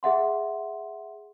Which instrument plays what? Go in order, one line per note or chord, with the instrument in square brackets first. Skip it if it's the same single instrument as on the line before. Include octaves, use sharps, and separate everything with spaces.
[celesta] G#4 E5 F#5 C6